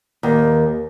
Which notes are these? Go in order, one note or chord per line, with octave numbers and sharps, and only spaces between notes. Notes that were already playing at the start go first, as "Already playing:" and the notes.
D#2